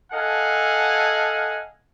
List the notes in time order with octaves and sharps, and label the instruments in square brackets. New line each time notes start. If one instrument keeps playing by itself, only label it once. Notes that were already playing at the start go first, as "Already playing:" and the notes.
[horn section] A4 D#5 F5 F#5 G#5